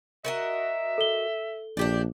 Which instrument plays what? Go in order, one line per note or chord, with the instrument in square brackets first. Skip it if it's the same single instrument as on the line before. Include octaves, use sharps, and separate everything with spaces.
[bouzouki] F#4 A#4 D#5 [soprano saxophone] E5
[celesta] A4 G7
[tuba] A#1 [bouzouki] D4 G4 D5